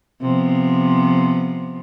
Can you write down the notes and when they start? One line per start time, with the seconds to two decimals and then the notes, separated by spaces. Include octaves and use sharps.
0.21 C3 F3 B3